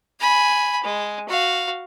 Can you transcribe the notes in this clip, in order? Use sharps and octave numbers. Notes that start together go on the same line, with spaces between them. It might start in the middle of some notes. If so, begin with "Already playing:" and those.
G#5 B5
G#3
F#4 F5